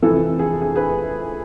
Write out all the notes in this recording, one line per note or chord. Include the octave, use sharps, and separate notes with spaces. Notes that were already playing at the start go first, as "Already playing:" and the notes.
F2 C3 E3 A4
G#4
G#4
G#4 B4